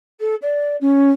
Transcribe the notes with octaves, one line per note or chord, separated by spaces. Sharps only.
A4
D5
C#4